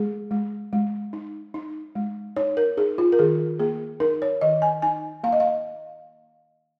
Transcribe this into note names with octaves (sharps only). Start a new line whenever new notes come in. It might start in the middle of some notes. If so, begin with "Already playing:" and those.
Already playing: G#3 G#4
G#3
G#3
D#4
D#4
G#3
D#4 C#5
A#4
D#4 G#4
F4
A#4
D#3 G#4
A#3 G#4
D#4 A#4
C#5
D#3 D#5
G#5
D#4 G#5
A#3 F5
D#5
F5